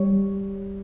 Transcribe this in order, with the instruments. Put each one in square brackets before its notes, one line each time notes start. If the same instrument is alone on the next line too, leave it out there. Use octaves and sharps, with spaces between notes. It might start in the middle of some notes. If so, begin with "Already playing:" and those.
Already playing: [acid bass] G3 [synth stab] C#5